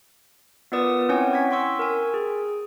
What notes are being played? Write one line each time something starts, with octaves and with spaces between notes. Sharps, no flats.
B3 F4 A#4 B4 D5 D#6
C4 C#4 E4 C#5 F#5 G#5
C#6 G#6 B6
G5 C6 C#6 E6 B6
A#4 G#5
G#4